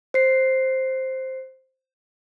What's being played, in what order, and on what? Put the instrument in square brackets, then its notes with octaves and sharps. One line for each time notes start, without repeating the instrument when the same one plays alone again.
[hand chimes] C5 C7